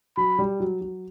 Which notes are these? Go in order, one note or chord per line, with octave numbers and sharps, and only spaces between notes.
F#3 B5
G3
F#3
F#3